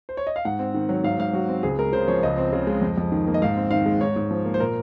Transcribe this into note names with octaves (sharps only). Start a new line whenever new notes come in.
C5
C#5
D#5
F5
G#2 F#5
C4
D#3
F#3
G#2 F5
G#2 F5
F#3 F#4
C4
C#2 G#4
G#3 A#4
C#3 C5
F3 C#5
C#2 D#5
C4
C#3
G#3
F2
F2
D#3
A#3
D#5
G#2 F5
C4
D#3 F5
G#3
G#2 C#5
G#2
F3
A#3
C5
A#2 A#4